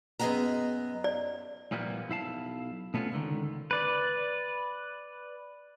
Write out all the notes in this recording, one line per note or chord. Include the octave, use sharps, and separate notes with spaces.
F#2 B3 G#4 D#5 F#5 A#5
D5
A#2 E3 F3 G3 A#3 B3
B1 E4 F5 A5
B2 A3 B3 C#4 F4
C#2 D3 D#3
B4 D5